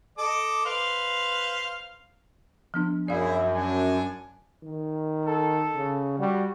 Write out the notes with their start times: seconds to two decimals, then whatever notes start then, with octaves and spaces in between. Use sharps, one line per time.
0.18 A4 D#5 D6
0.65 B4 C5 F5
2.74 F3 B3 D4
3.08 F#2 E4 G#4 D5 F5
3.55 D4 F#5 G#5
4.63 D#3
5.25 A4
5.75 C#3
6.19 G3 F#4